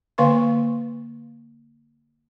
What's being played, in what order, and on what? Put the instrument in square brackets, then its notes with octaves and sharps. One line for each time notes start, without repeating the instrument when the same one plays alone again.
[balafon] D3 A#3 B4 F5 C6 C#6